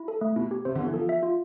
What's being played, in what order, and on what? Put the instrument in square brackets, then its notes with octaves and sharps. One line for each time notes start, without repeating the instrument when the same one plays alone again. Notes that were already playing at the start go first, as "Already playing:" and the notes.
Already playing: [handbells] E4
A4
A3
[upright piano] B2 [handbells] E4
[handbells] G4
[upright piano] C3 [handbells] C5
[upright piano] D3
[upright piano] E3 [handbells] B3
[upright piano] F3 [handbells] A4
[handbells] E5
F4